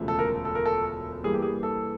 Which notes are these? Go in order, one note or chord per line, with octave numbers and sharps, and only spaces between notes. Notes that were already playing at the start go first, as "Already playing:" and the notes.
Already playing: E1 D2 C#3 F3 A3
A4
A#4
A4
A#4
A4
G2 E3 G3 A#3 G#4
G4
G#4
A4